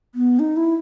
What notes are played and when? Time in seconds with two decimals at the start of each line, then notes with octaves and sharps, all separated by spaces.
0.15 B3
0.39 D#4
0.57 E4